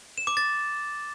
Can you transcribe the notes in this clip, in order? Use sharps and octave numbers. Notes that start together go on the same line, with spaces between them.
E7
D6
A6